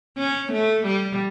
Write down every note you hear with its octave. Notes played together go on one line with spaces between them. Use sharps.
C#4
A3
G3